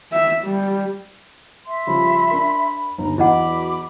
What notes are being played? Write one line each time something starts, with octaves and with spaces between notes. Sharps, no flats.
E5
G3
E5 C6
C#3 F3 G3 B5
D4 A#4
G1 D#2 A#5
E2 F#3 E4 D#5 F#5 B5 D6
F#4